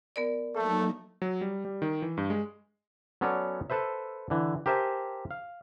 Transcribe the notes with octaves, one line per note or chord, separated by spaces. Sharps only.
B3 A#4 D5
F#3 A3 A#3 D#4 A4
F#3
G3
G3
D#3
E3
G2
G#3
F#3 B3 C#4 A4 C#5 D5
A4 B4 C5 E5
D3 E3
G4 A#4 C5 E5 G#5 A5
F5